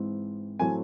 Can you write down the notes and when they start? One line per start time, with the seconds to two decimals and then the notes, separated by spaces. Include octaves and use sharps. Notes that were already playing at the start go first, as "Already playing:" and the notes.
Already playing: G#2 E3 G#3 C4
0.59 A2 F#3 A3 C4 G#5